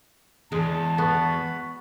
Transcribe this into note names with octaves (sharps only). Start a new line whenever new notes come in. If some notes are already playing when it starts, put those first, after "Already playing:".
E2 G#3 A5
B3 F#4 B5